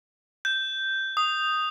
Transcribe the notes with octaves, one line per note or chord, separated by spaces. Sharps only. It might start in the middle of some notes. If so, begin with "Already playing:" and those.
G6
D#6